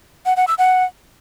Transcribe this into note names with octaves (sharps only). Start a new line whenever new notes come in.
F#5
F#5
E6
F#5